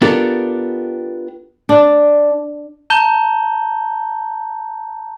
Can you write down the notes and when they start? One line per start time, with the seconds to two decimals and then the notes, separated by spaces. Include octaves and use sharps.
0.02 B3 D4 F4 G4 A4 A#4
1.69 D4
2.90 A5 A#5 G6 G7